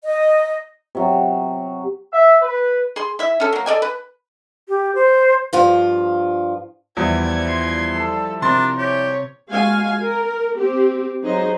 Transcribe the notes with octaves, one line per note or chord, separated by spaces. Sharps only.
D#5
C3 F#3
E5
B4
G#4 C6
E4 E5
C#4 A4
F#3 A#3
A4 D5 D#5 G#5
B4
G4
C5
G2 F3 F4
E2 F3 G3 E4 G#6
C6
A4
C3 D4 A#4 C6 A6
G4 C#5
G#3 F#4 F5 G#5
A#4
C4 G4
F#3 D#4 G#4 C5 D#5